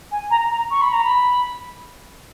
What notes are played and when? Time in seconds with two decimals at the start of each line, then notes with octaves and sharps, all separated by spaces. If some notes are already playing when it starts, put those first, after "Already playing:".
0.11 G#5
0.30 A#5
0.50 A#5
0.71 C#6
0.81 B5
0.93 A#5
1.04 B5